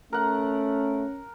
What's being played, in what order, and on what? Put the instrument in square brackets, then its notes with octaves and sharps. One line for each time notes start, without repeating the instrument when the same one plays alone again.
[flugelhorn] A3 [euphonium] C#4 [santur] A#4 F#5